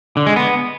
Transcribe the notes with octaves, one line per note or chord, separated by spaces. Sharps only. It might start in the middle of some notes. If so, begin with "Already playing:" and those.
D3
G#3
B3